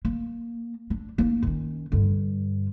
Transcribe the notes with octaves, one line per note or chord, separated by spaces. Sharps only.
A#3
D4
A#3 D#4
D#3 C#4
G2 D3